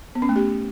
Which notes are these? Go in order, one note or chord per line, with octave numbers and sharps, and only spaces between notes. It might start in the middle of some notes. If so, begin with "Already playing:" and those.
B3
C#4
A3
G4